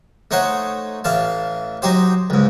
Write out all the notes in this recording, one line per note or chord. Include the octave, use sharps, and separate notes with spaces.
A3 D#4 C5 C#5 F#5
A1 E3 F5 A5
F#3 D#4 G4 C5
C#2 G#2